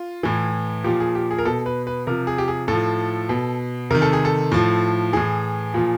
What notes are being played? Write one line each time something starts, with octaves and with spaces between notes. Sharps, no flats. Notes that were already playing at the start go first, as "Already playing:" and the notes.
Already playing: F4
A2 E3
A#2 F3 G4
G#4
G4
G#4
A#4
B2 A4
B4
B4
C3 F3 A#4
G#4
G4
G#4
A2 F3 A4
B2
C3 D#3 A#4
A4
G#4
A4
A2 F3
A2 E3 G#4
A#2 F3